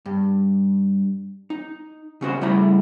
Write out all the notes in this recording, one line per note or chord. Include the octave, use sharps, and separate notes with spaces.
G2
D#4
C#3 C#4 F#4 C5
C#3 G3 A3 E4 A#5